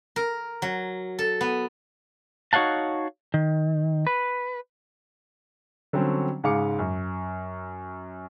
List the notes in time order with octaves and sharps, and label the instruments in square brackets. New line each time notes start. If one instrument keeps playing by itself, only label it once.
[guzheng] A#4
F#3
A4
B3
[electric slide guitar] D#4 F#4 C#5 F5 F#5 A5
D#3
B4
[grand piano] D3 F#3 G3 C4 C#4
G#2 C#3 G#3 F5 D6 C#7
F#2